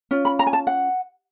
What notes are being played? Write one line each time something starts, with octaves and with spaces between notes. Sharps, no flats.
C#4 F4
B5
A#5
G#5
A5
F#5